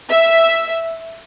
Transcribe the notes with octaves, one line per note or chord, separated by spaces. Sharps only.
E5